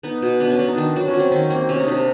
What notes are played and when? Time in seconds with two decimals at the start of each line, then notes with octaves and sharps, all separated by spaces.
0.03 B3 D#4
0.22 B2
0.40 B3 D4
0.50 C#4
0.59 B3 D4
0.68 D#4
0.77 D#3 D4
0.96 F#3 D4
1.08 C#4
1.13 F#3
1.19 C4
1.32 D#3 C#4
1.50 A#3 C4
1.69 C3 C#4
1.80 D#4
1.88 C3 D4